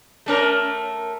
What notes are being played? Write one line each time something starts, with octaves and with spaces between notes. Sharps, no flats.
A3 C#4 A#4